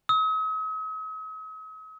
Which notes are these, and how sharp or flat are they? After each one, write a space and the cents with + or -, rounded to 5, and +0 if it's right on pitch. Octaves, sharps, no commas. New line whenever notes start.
D#6 +45